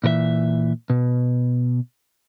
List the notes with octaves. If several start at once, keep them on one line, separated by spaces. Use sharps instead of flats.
A#2 E3 A#4 E5
B2